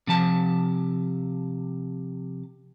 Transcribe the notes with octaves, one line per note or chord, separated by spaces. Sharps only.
C3 F3 A5